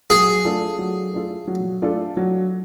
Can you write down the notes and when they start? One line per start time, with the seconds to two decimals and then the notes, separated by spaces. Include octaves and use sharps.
0.10 F#3 G#4
0.45 A3 D4 F4 A4
0.79 F#3
1.14 A3 D4 F4 A4
1.48 F#3
1.82 A3 D4 F4 A4
2.17 F#3